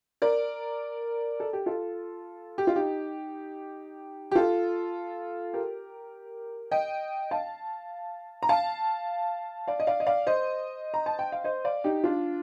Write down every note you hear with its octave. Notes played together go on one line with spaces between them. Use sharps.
A#4 D5
A4
G4
F4 A4
G4
F4
D#4 G4
G4
F4 A4
G4 A#4
D#5 G5
F5 A5
A#5
F5 A5
D5 F5
D#5
D5 F5
D#5
D5 F5
C5 D#5
A#5
A5
G5
F5
C5 D#5
D5 F5
D#4 G4
D4 F4